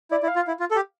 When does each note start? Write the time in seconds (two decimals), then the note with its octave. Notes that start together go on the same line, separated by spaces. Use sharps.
0.11 E4 D5
0.23 E4
0.28 F5
0.36 F4
0.48 E4
0.60 F4
0.71 A4
0.76 G4